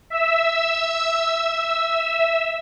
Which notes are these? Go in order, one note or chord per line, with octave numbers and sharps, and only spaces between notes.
E5 E6